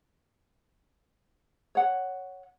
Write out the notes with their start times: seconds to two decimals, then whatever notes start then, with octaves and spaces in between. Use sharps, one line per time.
1.75 C#5 F#5